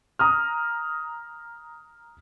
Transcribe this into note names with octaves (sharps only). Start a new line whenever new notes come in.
A#5 D#6 F6